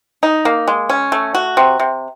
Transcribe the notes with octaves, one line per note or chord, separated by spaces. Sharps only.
D#4
A#3
G#3
C#4
A3
F#4
C3
C3